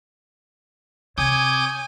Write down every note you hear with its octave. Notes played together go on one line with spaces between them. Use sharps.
C3 C#5 G#5 D6 D#6 G6